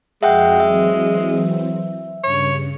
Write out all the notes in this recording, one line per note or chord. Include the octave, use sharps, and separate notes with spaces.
F2 G#3 F#4 E5 F#5 G5
E3 F#3 C4 E5
G2 C#3 C#5